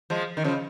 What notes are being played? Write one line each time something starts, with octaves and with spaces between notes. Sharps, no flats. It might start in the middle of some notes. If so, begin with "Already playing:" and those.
F3 G#3
D#3
C#3 F3